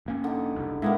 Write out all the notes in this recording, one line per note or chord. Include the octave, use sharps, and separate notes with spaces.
F1 A#3 C#4
D3 D#4
F#1 C2
A2 G#3 A#3 B3 E4